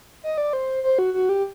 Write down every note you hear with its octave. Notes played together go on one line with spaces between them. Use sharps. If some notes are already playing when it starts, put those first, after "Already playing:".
D#5
D5
C5
C5
F#4
F#4
G4